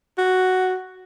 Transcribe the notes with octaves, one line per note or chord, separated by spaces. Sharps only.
F#4